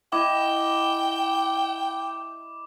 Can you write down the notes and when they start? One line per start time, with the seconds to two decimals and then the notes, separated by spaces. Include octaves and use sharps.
0.13 E4 D#5 G5 D6